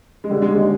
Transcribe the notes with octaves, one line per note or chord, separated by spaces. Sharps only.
G#3
D3 G3
G#3
D#2
G#3